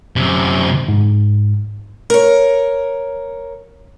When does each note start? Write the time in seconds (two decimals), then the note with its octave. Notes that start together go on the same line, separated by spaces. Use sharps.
0.16 F#2 C3
0.88 G#2
2.10 A#4 C#5